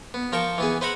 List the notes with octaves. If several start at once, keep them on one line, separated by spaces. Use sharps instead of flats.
B3
F3 A#4 G5 A5 C#6
E3 B3 G#4
B4 C5 E5 F#5 A#5 B5